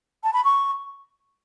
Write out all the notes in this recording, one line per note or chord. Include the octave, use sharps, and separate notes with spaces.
A5
B5
C#6